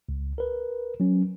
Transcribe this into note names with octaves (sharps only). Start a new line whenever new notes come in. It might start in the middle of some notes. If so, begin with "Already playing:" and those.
C#2
A#4 B4
F#3 C#4